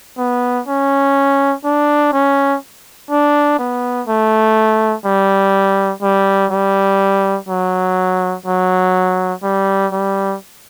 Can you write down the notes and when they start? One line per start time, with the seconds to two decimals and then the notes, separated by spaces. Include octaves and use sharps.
0.18 B3
0.67 C#4
1.64 D4
2.13 C#4
3.10 D4
3.59 B3
4.07 A3
5.05 G3
6.02 G3
6.51 G3
7.48 F#3
8.46 F#3
9.43 G3
9.92 G3